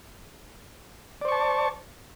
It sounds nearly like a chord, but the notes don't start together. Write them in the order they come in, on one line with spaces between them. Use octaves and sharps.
D5 C5 C#6 A5